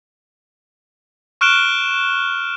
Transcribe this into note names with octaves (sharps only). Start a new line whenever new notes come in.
C#6 F6 F#6 D7 E7 G7